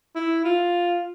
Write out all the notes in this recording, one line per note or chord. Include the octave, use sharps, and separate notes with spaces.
E4
F4